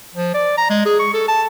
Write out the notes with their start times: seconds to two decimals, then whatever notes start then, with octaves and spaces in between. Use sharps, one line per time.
0.15 F3
0.34 D5
0.58 A#5
0.70 G#3
0.86 G#4
0.99 C#6
1.14 A4
1.28 A5